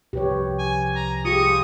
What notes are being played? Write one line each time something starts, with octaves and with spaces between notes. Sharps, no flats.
C2 C3 F3 G4 B4 C#5
G#5
A#5
F4 G4 G#4 C#6 D#6